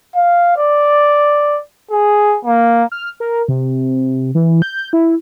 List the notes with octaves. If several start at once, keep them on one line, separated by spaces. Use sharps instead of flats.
F5
D5
G#4
A#3
F6
A#4
C3
E3
G6
E4